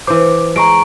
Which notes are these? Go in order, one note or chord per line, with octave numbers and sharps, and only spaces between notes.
E3 C5 D6
G#3 A#5 C#6 D7